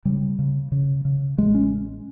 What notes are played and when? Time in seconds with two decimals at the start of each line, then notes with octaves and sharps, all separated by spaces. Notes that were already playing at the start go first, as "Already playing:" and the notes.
0.05 C#3 G3
0.39 C#3
0.72 C#3
1.05 C#3
1.38 A1 G#3
1.55 C#4